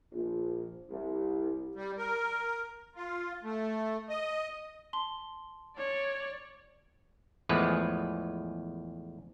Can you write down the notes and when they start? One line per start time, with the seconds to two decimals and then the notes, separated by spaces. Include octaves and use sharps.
0.12 A#1
0.90 C2
1.75 G3
1.98 A#4
2.96 F4
3.43 A3
4.09 D#5
4.93 A5 C6 G7
5.77 C#5 D5
7.49 E2 A2 F3 G#3 B4